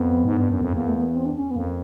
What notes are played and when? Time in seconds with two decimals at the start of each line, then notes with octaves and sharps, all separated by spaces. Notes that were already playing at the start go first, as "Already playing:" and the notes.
Already playing: F2 B3
0.25 G#2
0.37 G2
0.50 F#2
0.61 F2
0.73 E2 A#3
0.88 A3
0.95 A#3
1.01 B3
1.15 C4
1.26 D4
1.36 C#4
1.51 B3
1.56 F2 A#3